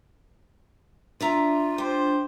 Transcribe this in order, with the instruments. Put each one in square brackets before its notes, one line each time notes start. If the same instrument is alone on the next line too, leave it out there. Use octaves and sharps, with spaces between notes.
[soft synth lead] D4 [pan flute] F4 [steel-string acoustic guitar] D5 E5 A#5
[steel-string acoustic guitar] G4 [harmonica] C5